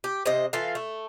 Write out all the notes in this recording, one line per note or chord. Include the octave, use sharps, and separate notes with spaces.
G4
C3 C5 D#5
E3 F4 A4 F5
A3